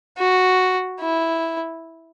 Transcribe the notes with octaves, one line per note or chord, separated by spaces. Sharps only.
F#4
E4